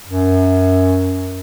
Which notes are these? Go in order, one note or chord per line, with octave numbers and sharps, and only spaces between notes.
F#2